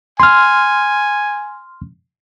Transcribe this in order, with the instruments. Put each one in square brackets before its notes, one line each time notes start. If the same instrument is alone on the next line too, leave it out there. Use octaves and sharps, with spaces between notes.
[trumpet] G#5 [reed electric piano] C6 F6